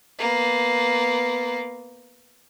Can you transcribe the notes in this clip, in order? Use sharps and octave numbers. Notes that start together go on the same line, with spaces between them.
A#3 B3